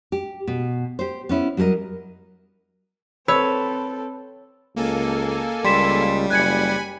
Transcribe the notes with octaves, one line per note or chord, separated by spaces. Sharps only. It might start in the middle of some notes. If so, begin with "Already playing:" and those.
G4
B2
G4 C5
B3 C#4 E4
F#3 G3 G4 A#4 D#5
C4 A4 B4 C#5 E6
C#2 A#3 A4 G#5
C#2 G3 C6 B6 E7
F#1 G#5 B5 F#6 G#6 C#7